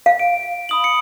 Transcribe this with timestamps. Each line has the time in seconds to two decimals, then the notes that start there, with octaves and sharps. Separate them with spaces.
0.06 F5
0.19 D7
0.69 B5 D#6 F#7
0.84 C#7